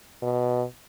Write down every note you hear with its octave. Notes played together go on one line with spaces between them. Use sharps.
B2